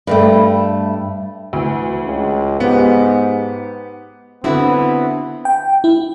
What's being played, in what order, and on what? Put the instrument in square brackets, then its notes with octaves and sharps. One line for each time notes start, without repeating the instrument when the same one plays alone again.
[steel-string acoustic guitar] G2 G3 A3
[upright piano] D2 [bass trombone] E3
[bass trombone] C#2
[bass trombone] G#2 [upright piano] B3 G4
[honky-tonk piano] D3 [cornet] B3 [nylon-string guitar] C4 E4 F#4
[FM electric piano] G5
E4